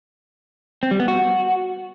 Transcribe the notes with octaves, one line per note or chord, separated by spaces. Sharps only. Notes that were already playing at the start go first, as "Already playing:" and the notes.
C4
G3
B3
F#4